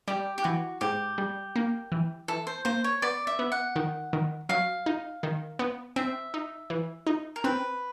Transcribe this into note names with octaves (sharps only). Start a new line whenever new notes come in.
G3 G4
G4
E3 F#4
G#2 G4
G3
A#3
E3
E3 A4
C5
A#3 C5
C#5
B3 D5
E5
B3
F#5
D#3
D#3
F#3 F5
D#4
D#3
B3
C4 E5
D#4
E3
D#4
A#4
C4 B4